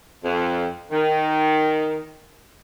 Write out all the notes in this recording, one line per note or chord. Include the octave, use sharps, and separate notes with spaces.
F2
D#3